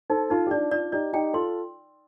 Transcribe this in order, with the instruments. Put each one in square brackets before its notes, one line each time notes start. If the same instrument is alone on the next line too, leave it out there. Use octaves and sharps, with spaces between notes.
[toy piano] D#4 [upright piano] A4 C5
[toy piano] D#4 [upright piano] F4 A4
[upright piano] G4
[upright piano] D4 F4 [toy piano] D5
[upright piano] D4 F4 [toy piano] D5
[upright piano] D#4 G4 [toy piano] D5
[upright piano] D#4 G4 [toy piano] G5
[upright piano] F4 A4 [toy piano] C6